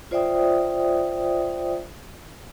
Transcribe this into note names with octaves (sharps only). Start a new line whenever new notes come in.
F4 C5 D5 E5 G5 D#6